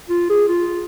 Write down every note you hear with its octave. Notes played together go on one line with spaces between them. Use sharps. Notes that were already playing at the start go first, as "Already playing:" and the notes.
F4
G#4
F4